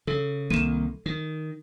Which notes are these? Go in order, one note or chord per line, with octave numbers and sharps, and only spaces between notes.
C#3 A4
C2 D#3 A#3 D#7 E7
D#3